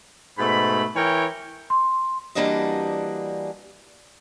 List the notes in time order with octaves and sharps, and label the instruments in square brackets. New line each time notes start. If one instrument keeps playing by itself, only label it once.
[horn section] G#2 B2 A3 B5
E3 E4 A#4 C#5 G5
[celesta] C6
[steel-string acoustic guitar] E3 G3 A#3 D4 F#4 D#5